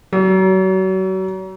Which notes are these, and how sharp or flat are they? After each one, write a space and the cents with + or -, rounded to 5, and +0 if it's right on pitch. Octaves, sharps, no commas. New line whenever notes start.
F#3 +35